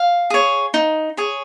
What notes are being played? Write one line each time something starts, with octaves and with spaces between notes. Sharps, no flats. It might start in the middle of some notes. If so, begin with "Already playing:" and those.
Already playing: F5
G#4 C#5
D#4
G#4 C#5